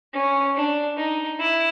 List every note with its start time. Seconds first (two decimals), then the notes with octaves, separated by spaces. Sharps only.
0.13 C#4
0.55 D4
0.97 D#4
1.40 E4